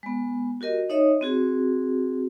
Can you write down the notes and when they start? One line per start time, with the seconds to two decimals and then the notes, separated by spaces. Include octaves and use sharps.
0.03 G#3 B3
0.61 F#4 G4 A#4 D#5
0.90 D#4 C#5 D#5 E5 D#6
1.21 C4 F#4 G#4